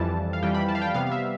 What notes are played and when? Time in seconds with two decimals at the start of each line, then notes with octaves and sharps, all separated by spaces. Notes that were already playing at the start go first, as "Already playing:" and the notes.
Already playing: F2 E3 G3 A5
0.33 F5
0.42 F2 E3 G3 G5
0.54 B5
0.68 A5
0.75 F5
0.82 G5
0.94 C3 G3 B3 F5
1.06 F5
1.12 E5